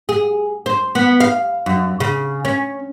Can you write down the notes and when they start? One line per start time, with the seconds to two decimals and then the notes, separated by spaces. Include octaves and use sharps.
0.09 G#4
0.66 C5
0.95 B3
1.20 F5
1.66 F#2
2.00 C#3
2.45 C#4